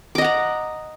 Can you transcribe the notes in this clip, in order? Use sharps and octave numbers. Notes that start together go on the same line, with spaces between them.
D#5 F#5 A#5 D6